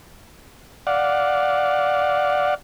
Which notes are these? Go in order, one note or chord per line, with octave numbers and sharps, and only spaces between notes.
D5 F5 F#5